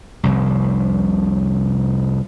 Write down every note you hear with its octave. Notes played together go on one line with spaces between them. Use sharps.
F1 C2